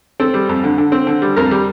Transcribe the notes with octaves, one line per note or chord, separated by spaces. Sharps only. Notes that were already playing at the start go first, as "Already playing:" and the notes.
C4 A4
G3
F2
D3
D3
C4
D3
G3
F2 A#4
G3